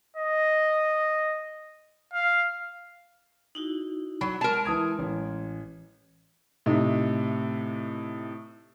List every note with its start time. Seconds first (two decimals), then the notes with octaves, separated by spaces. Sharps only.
0.17 D#5
2.13 F5
3.55 D#4 E4 F#4
4.21 F#3 B5
4.41 G#3 A#4 A5 C6
4.65 E3 D#6 G#6
4.99 A1
6.66 A2 C3 D#4